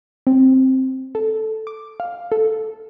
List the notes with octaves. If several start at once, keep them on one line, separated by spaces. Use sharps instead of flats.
C4
A4
D6
F5
A4